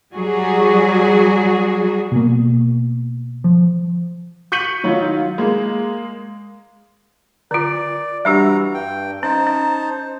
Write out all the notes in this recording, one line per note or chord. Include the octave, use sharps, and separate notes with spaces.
F#3 G3 F#4 G#4
B2 A#3
F3
C#6 G6 B6 C#7 D#7 F#7
D#3 F#3 D#4 F4
G#3 A#3
D3 F4 D5
E3 G3 D4 F#4 G4 A#5
G2 G5
C#4 D#4 C5 A5
C#4